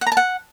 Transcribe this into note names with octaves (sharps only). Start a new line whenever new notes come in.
F#5
A#5
A5
F#5